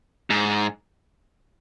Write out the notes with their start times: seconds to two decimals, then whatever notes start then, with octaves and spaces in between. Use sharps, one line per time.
0.30 G#2